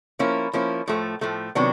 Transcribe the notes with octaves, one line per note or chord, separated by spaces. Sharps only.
F3 A#3 C#4 E4
F3 A#3 C#4 E4
A2 F3 A3
A2 F3 A3
C3 D#3 F#3 B3 D4